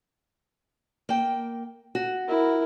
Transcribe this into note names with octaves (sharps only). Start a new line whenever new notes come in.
A#3 G5
F#4
E4 A#4